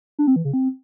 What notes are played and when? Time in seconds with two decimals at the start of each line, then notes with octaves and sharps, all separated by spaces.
0.19 D4
0.27 C4
0.36 E3
0.45 C#3
0.53 C4